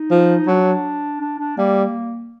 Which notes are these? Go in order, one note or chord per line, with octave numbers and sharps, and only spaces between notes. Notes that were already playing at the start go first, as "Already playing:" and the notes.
Already playing: D#4
F3
F#3 D4
D4
D4
G3 A#3